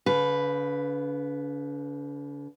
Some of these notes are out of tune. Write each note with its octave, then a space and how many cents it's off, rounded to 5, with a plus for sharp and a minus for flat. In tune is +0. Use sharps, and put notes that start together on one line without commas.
D3 -45 B4 +0 F5 +0